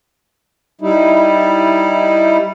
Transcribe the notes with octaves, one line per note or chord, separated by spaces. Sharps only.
G3 D#4 E4